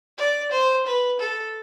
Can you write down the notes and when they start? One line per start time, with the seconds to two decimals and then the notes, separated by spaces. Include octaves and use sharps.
0.18 D5
0.52 C5
0.86 B4
1.20 A4